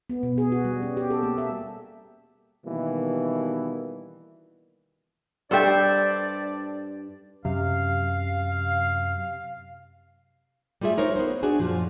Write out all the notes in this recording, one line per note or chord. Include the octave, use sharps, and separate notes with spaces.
B3
B2
G#4
F#4
G3
C#4
G4
A4
A#3
E5
B2 D#3 E3 G3 A#3
G2 D4 A4 C5 D5 E5 G5
F#2 C3 F5
G3 A3 F4 G#4 E5
D#4 A#4 C5 C#5
B3 D#4 C5
D4 F#4 G#4
F#2 A#2 F3